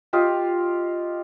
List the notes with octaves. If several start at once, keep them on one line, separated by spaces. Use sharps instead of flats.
F4 G4 D#5 F5